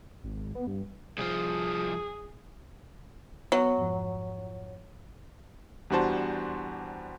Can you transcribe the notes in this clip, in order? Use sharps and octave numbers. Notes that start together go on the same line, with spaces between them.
G#1
G#1
B3
G2
C2 F3 G#4
F#3 B3
F2 G#2 F3
E2 G3 D4 F#4 C5 A5